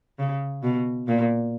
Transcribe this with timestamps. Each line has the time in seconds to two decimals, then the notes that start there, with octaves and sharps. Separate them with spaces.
0.19 C#3
0.63 B2
1.07 A#2